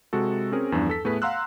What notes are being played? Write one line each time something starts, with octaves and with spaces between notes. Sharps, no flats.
C3 G#3 F#4 A4
C4 C#4 G#4 A#4
E2 G2 F3 D4
A4 B6
A2 A3 B3 G#4 B4 B6
F5 F#5 A#5 C6 E6 F#6